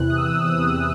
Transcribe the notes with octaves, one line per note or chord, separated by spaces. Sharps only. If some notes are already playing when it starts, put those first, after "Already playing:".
Already playing: E2 C3 E3 F#6
D#6
E6
E2 C3 E3 D#6